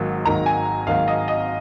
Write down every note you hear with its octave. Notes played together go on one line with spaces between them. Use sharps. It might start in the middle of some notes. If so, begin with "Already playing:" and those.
Already playing: G#1 G#2 D#3 F#3 A#3
G#1 G#2 D#3 F#3 A#3 A#5
G#5
G#1 G#2 D#3 F#3 A#3 F5
D#5
D#5